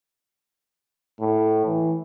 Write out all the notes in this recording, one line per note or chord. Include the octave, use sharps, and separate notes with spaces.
A2
E3